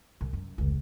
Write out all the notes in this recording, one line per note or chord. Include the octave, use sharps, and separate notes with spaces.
C2
F#2
F1 C#2